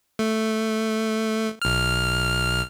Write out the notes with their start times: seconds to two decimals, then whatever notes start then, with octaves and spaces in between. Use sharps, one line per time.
0.19 A3
1.62 B1 F6